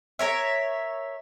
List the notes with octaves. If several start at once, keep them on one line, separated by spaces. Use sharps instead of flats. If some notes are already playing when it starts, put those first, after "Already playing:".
A#4 C#5 E5